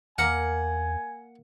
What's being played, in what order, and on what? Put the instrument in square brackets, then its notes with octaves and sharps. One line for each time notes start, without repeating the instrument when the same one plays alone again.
[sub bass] E2 [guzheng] A#3 A#4 [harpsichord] F#5 [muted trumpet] G#5